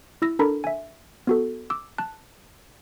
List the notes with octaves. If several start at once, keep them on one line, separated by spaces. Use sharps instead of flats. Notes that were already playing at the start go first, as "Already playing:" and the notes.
E4 E6 A#6
D4 A4 A#4 A#5 B5
E5 G#5
B3 F#4 A4
D6 E6
A5 F#6